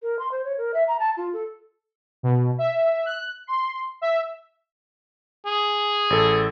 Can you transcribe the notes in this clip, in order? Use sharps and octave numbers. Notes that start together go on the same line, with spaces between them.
A#4
C6
C5
C#5
A#4
E5
A#5
A5
F4
A4
B2
E5
F#6
C6
E5
G#4
A1 A4